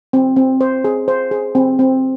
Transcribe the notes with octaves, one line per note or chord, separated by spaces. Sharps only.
C4
C4
C5
G#4
C5
G#4
C4
C4